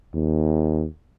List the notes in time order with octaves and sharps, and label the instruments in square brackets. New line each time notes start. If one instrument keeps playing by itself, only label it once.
[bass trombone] D#2